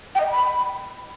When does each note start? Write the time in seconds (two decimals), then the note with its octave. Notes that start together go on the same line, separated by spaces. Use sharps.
0.15 G5
0.20 D#5
0.26 G5
0.31 B5